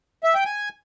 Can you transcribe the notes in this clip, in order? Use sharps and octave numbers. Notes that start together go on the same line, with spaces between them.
E5
G5
G#5